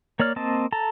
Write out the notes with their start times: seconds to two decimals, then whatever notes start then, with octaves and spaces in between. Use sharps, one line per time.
0.19 A#3 C#5 D5 F6
0.36 A#3 C4 D#5 A5
0.72 A4 A5 A#5